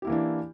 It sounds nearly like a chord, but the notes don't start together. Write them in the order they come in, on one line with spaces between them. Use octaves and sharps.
G4 E4 A#3 E3 D4